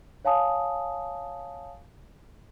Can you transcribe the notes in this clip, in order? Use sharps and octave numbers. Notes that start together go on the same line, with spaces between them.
C#5 F5 G#5 A5 D#6